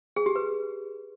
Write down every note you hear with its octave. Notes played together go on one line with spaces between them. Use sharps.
G#4
G4
B4